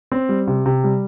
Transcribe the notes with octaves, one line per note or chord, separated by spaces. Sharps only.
C4
G3
C3
C3
G3